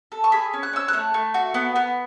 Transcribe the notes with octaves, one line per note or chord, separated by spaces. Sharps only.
A4
C#6
G#4 B5
C#4
F#6
C#4 E6
A3 F#6
A3
F#4
B3
B3